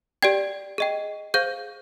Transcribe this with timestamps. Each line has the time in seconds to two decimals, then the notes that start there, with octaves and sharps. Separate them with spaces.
0.22 G4 D5 G5 G#6
0.78 G#4 D#5 G5
1.34 G#4 C5 F5 G6